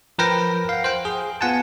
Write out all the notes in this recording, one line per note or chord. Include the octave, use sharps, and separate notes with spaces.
F3 A#4 B4 G5 A#6
F5 F#5
C5 G5
G#4
B3 F4 F#5 G#5 A5